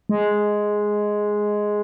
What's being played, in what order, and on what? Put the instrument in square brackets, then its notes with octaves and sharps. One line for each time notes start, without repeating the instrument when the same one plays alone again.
[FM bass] G#3